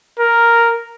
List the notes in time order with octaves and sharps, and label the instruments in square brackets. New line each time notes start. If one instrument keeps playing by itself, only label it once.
[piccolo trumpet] A#4